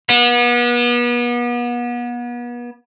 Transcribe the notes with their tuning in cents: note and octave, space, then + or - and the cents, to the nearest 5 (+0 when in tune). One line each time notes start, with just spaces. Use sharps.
B3 -35